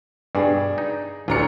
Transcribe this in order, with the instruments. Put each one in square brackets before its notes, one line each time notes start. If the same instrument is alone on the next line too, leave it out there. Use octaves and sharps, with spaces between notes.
[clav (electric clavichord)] G2 B2 [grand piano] D4 G#4
[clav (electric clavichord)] D#4
[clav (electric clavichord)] A1 D4 [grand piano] D2 A#5 C#7